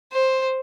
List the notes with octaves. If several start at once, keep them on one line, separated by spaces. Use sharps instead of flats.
C5